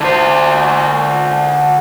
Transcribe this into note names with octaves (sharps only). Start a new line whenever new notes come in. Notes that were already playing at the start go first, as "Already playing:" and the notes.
D3 C5